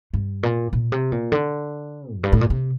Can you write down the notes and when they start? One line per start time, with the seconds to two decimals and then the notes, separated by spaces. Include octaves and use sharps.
0.14 G2
0.43 A#2
0.73 A#2
0.92 C3
1.12 A#2
1.32 D3
2.15 F2
2.23 G2
2.32 A2
2.41 A#2
2.50 C3